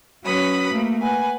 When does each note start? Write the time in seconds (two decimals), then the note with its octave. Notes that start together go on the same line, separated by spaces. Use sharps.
0.24 F#3 C#4 F#4 B4 B5 D#6
0.71 A3 A#3
1.01 B4 F#5 G#5